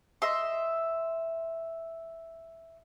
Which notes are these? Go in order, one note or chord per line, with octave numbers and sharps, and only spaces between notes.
D#5 E5 C6